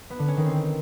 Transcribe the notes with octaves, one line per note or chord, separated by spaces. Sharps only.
B3
D3
C#4
D#3
C4